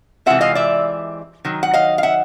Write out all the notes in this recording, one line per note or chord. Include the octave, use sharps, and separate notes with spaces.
C3 E3 G#3 C4 F4 E5 F#5
D#5 F5
D5 E5
D#3 F#3
F#5
D#5 F5
F5
E5 F#5